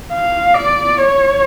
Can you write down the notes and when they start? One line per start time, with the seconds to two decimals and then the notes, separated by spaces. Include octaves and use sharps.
0.13 F5
0.54 D5
0.98 C#5